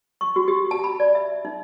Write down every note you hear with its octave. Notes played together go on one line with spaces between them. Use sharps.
C#6
F#4
G4
A5
B5
D5
E5
D#4